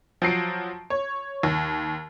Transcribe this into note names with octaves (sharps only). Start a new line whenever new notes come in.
F3 F#3 C7 D7
C#5
D#2